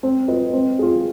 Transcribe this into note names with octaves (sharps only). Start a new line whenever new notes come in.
C4
F4 B4 D#5
C4
F4 G#4